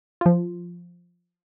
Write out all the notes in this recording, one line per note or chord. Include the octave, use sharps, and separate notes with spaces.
F3 F4